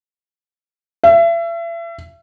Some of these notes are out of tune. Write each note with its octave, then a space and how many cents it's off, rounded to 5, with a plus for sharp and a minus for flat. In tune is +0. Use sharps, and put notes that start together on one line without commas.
E5 +35